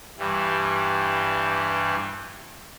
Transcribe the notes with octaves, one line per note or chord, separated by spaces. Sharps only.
G2 E3 G3